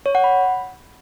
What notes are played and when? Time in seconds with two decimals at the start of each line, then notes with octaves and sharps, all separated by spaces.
0.06 C#5
0.15 F#5
0.24 B5